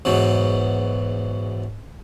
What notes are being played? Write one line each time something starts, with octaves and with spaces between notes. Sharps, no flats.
E2 G#2 B2 F#3